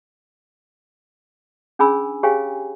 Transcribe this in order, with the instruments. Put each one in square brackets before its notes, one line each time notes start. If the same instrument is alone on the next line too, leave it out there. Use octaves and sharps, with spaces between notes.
[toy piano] C#4 D4 G#4 G#5 B5 E6
G4 G#4 C#5 F5 G5 G#5